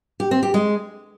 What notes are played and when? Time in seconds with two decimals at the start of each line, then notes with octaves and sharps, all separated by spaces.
0.20 G4
0.31 C4
0.43 G4
0.54 G#3